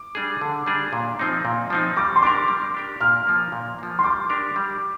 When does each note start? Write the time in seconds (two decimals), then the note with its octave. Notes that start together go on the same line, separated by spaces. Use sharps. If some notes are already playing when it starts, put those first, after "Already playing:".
Already playing: D6
0.15 G3 D4 G#4
0.41 D3
0.66 G3 D4 G#4
0.93 A#2
1.19 F3 C4 D#4
1.45 A#2
1.70 F3 C4 D#4
1.96 G3 D6
2.16 C6
2.22 D4 G4 A#4 D6
2.48 G3
2.74 D4 G4 A#4
3.01 A#2 F6
3.27 F3 A#3
3.52 A#2
3.79 F3 A#3
3.99 C6
4.04 G3 D6
4.30 D4 G4 A#4
4.56 G3